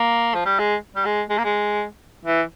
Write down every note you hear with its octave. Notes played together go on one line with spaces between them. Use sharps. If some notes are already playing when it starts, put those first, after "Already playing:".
Already playing: A#3
F3
G3
G#3
G3
G#3
G#3
A#3
G#3
E3